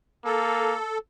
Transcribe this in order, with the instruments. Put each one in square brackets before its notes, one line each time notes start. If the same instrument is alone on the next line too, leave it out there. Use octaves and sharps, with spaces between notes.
[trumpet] A#3 [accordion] A4